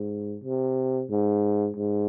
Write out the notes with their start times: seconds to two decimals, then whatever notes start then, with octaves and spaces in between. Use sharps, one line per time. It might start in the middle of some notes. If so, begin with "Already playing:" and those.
Already playing: G#2
0.44 C3
1.10 G#2
1.76 G#2